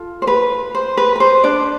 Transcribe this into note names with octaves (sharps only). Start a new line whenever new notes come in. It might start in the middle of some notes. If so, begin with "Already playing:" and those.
Already playing: F4 A4
C5
B4
C5
B4
B4
C5
D4 D5